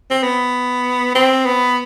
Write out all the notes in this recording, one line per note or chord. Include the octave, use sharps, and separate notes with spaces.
C4
B3
C4
B3